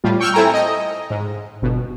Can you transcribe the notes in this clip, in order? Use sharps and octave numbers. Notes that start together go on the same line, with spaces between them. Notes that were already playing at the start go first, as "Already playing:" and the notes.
A2 G3 F4
G5 C#6 E6 F6 G6
C4 E4 A4 G5 G#5 A#5
D#5
G#2
G1 B2